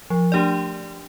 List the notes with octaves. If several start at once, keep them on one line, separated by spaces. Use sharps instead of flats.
F3
A3 D4 G4 D5